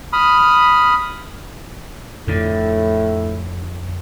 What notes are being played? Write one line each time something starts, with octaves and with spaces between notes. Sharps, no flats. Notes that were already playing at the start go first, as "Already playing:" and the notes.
B5 D#6 F6
F2 A2 D3